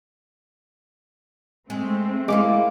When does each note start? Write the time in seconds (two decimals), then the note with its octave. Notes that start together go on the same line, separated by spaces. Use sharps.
1.70 G#3 A3 C4
2.28 G#3 A#3 E4 F4 D6